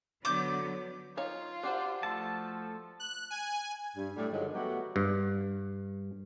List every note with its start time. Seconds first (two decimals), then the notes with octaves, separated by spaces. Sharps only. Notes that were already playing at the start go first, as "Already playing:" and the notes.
0.25 D3 F#3 B3 D6 G6
1.17 D#4 F4 C#5 F5
1.63 D4 F#4 G4 C5
2.03 F3 A3 A4 A5
3.00 F#6
3.30 G#5
3.97 G2
4.16 A2 G3
4.32 G2 D3 D#3 F3 F#3 G#3
4.54 F#3 G3 A3 B3 F#4 G4
4.96 G2